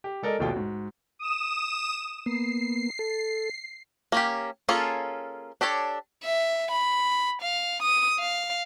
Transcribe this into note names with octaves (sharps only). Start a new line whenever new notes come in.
G4
G#3 A4 A#4 D5 D#5
A#1 D#2 B2 A3 F4 G5
G#2 F#4
D#6 E7
A#3 B3 C7
A4
A#3 C#4 G4
A#3 C#4 F4 G#4 A4
D4 G4 A4 C#5
E5
B5
F5
D#6
F5